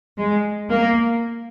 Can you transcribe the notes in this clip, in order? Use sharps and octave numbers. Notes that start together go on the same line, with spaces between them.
G#3
A#3